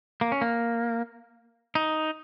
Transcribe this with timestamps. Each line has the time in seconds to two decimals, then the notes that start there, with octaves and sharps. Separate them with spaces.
0.21 A#3
0.32 C#4
0.41 A#3
1.75 D#4